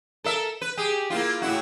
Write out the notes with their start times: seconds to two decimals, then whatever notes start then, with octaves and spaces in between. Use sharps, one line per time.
0.24 A4 A#4 E5
0.61 B4
0.77 G4 G#4
1.10 A#3 E4 F4
1.42 A2 E4 F#4